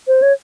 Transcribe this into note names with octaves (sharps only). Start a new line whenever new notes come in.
C5
C#5